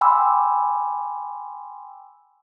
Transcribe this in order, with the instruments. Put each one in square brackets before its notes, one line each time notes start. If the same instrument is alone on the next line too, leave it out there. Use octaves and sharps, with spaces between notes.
[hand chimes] G5 G#5 B5 C6 D6 E6